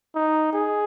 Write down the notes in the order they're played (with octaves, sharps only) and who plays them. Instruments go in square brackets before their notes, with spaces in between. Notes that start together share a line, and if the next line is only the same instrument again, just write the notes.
[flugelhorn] D#4
G#4